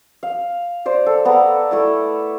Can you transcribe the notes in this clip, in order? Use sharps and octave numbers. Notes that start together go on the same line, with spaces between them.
F5
C5 D5
A4
B3 A4 D5 A#5
A3 E4 D5